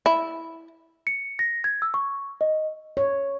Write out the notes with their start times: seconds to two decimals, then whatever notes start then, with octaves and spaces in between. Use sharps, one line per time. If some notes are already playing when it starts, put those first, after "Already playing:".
0.06 E4
1.07 C#7
1.39 A#6
1.64 G#6
1.82 E6
1.94 C#6
2.41 D#5
2.97 C#5